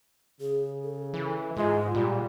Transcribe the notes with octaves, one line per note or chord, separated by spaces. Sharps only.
C#3 G#4
A4
E3
G#2 G#3 F4
A#2 G3